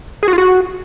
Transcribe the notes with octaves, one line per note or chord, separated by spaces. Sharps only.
G#4
F#4
F4
F#4